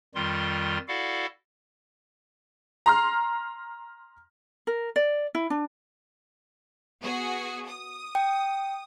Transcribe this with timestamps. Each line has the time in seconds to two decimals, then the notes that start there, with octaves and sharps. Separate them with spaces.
0.15 F2 D#3 G3 F4 C6
0.88 E4 F#4 A4 D5 F5 F#5
2.86 A#5 C6 F6
4.67 A#4
4.96 D5
5.35 E4
5.50 D4
7.02 B3 F#4 G#4
7.67 D#6
8.15 G5